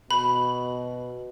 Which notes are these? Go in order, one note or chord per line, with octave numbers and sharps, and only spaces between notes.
B2 B5